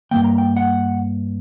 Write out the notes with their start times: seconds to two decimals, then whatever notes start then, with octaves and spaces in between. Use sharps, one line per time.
0.11 G2 E3 A#3 G5
0.24 A#5
0.38 G5
0.57 F#5